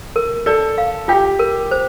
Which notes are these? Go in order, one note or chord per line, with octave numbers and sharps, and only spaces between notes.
A#4
A4 D5
F5
F4 G4
A#4
C5